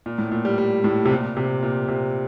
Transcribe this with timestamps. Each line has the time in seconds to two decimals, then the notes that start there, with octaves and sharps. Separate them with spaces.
0.06 A#2
0.18 A2
0.32 A#2
0.45 G3
0.58 G3
0.84 A2
1.05 C3
1.10 A#2
1.37 C3
1.63 A#2
1.88 C3